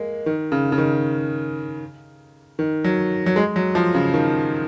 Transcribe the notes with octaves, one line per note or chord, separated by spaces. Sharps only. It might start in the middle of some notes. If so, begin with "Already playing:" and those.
Already playing: G#3 A#3
D#3
C#3
C#3
D#3
D#3
F#3
F#3
G#3
F#3
F3
C#3
D#3